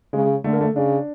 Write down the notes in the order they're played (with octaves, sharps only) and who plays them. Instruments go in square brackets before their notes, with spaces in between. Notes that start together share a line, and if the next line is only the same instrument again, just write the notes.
[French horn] C#3 [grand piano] G#3
[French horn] D3 [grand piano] A3
[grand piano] A#3
A3
[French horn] C#3 [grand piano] D4